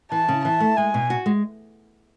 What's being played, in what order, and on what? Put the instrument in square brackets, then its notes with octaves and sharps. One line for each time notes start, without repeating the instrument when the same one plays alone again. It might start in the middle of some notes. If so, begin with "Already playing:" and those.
[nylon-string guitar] E3 [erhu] A5
[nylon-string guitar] C#3
[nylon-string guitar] E3 [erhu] A5
[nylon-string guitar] A3
[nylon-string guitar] G#3 [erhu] G#5
[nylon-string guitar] B2
F#4
G#3